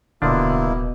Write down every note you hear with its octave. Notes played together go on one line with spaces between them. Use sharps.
D1 B2 D3 F3 A#3 D4 E4